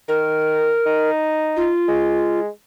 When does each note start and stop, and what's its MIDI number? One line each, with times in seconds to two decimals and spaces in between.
0.08 0.71 51
0.08 1.10 70
0.86 1.69 63
1.56 2.40 65
1.88 2.48 56